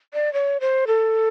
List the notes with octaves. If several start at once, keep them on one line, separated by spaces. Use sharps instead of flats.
D5
C#5
C5
A4